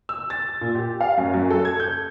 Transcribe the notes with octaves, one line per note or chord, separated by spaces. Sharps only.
E6
A6
A#2
G4
F5
F#2
F#2
A4
G#6
G6